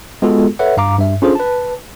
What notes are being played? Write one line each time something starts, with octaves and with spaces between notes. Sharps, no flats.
G#3 B3 F4 F#4 G#4 A4
A4 B4 C#5 E5 F#5
G2 F5 A#5 D6
G2 E5
C#4 D4 F4 G#4 A4 C5
B4 A5